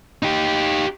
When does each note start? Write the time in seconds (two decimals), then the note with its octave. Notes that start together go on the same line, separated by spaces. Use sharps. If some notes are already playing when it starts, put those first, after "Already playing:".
0.23 D#4 G4